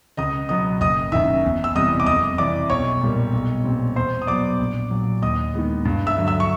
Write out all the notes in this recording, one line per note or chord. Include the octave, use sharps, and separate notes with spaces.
C#2 D#5 D#6
B2 F#3 B3 D#5 D#6
F#1 D#5 D#6
F#2 D#3 E5 E6
E2
E6
C3 E3 G3 B3 D#5 D#6
D6
F2 D#5 D#6
C3 E3 D5 D6
B1 C#5 C#6
A#2 G3 A#3
B1
A#2 G3 C4
E2 C5 C6
D#6
B2 F#3 B3 D5 D6
A#1
A#2 F#3
D#2 D#5 D#6
D#3 G#3 B3
G2
E5 E6
D3 F#3
E5 E6
C#6